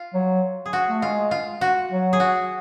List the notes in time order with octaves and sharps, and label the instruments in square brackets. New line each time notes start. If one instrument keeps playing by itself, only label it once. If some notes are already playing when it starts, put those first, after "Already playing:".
Already playing: [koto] F4
[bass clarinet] F#3
[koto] G#4
F#4
[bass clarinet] A3
[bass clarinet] G#3 [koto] F4
[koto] F4
F#4
[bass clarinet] F#3
[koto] G#4
F#4